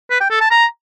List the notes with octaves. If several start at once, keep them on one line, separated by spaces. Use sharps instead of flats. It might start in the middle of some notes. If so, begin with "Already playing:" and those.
B4
G5
A4
A5
A#5